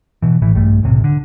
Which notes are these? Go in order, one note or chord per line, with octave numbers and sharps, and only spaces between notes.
B2 E3
A1 A2 E3
A#1 G2 A3
E1 B1 A2 C3
D3